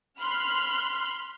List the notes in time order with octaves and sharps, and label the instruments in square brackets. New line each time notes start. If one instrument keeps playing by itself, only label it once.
[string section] B5 C6 F#6 [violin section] F6